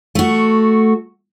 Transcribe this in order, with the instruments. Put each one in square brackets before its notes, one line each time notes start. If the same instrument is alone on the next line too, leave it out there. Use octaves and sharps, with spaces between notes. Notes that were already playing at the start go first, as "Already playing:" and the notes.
[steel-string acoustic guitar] A3 F#4